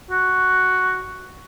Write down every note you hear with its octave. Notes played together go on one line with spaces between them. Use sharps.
F#4